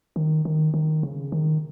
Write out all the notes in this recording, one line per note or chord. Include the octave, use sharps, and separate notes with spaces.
D#3
D#3
D#3
C#3
D#3